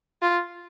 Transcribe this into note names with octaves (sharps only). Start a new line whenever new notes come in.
F4